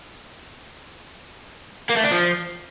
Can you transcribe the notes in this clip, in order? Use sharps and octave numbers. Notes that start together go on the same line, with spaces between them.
A#3
A3
D4
F3